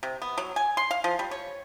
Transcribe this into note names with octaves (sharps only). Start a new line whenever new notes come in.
C3
B3
F#3
G#5
C6
F5
F3
G3
C#5